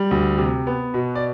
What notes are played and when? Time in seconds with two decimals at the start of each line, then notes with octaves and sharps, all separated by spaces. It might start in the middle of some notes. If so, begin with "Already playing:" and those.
Already playing: G3
0.11 D2
0.38 C3
0.67 B3
0.94 B2
1.15 D5